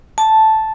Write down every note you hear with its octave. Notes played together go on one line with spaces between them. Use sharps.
A5